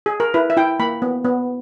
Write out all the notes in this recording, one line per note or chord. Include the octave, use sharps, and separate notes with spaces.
G#4
A#4
E4 B4
E5
E4 G5
A#3 B5
B3
B3